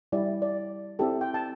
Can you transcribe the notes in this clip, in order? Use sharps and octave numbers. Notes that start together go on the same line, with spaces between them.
G3 E4 G4 D5
D5
C4 E4 G4 A4
G5
A5